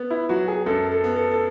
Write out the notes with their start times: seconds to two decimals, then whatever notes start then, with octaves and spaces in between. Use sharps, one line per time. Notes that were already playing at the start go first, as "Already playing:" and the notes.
Already playing: B3
0.10 E4
0.29 F#3 F#4
0.48 G#4
0.66 F#2 A4
0.92 A4
1.04 B3
1.16 A4
1.31 A4